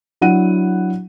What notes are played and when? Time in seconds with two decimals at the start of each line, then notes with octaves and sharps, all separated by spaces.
0.21 F#3 D4 E4 F#5 D#7